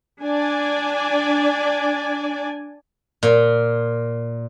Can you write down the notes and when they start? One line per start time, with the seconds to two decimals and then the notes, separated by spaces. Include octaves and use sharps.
0.22 D4 D5 G#5
3.23 A#2